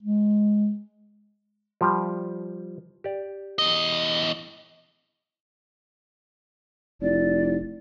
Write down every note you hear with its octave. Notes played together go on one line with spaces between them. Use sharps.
G#3
F3 G3 G4
G4 D5
E2 D#5
F1 E4 D5